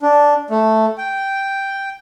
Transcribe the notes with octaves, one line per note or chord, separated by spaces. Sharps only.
D4
A3
G5